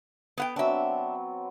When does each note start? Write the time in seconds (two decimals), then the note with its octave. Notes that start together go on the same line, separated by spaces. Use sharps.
0.38 B3 F#5 G5
0.56 F#3 B3 C4 D4 E5